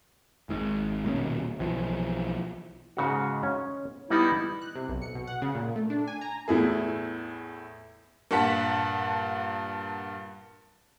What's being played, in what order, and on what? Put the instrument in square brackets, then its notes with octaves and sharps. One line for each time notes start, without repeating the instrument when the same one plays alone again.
[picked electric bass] G#1 G#2
D#1 D#2 B2 C#4
B1 E3 F3
[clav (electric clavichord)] G#2 C#3 F#4
C#4
[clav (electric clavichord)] G3 B3 D#4 [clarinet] E4
[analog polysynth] F#6
C3
B1
C#7
B2
F#5
C#3
A#2
A3
D4
G#5
A#5
[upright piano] E2 A2 E4 G#4
[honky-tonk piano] G2 A#2 F#5 A5 B6